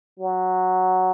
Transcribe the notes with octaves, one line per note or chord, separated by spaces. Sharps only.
F#3